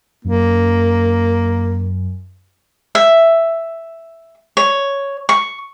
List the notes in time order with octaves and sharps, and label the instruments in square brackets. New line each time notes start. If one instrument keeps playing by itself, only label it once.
[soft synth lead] F#2 [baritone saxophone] A#3
[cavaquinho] E5
C#5
C#6